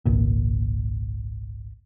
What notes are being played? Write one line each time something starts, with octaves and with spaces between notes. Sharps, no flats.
G#1 C#2 A#2